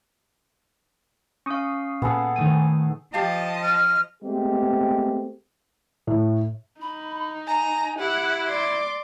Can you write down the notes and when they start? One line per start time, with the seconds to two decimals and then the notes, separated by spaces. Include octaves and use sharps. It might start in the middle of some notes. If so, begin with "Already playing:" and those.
1.46 C#4 F5 C#6 D#6
2.02 A#2 B3 G#4 A4
2.36 D#3 A3 G#5 D#7
3.14 F3 G4 D#5 F5 G5 A5
3.62 F6
4.23 G#3 A3 B3 C4 G4 G#4
6.07 A2
6.81 D#4 B5
7.47 G#5 A#5
7.99 E4 G4 F#5
8.47 D5 C6 D6